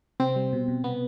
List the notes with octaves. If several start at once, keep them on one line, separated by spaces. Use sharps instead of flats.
C3 C4
G3
B2
B2
C3 B3